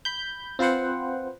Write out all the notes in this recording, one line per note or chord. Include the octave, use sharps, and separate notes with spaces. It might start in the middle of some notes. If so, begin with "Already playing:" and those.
B5 G6
C4 F4 B4 C5 F#5